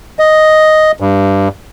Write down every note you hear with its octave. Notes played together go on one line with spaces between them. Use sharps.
D#5
G2